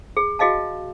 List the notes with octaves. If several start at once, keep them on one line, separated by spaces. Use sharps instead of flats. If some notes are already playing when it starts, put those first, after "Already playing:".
G#4
F#4 G#4 D#5 F5 A5